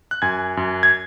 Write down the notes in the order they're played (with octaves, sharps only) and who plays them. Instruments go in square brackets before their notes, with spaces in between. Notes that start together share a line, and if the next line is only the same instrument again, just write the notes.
[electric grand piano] F#6
F#2 G#5 G#6
F#2
G#6